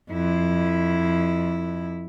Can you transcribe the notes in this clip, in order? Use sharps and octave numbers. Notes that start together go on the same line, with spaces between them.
F2 E4